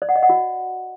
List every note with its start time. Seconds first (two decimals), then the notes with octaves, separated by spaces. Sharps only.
0.02 D5
0.09 F#5
0.16 D#5
0.23 F#5
0.30 F#4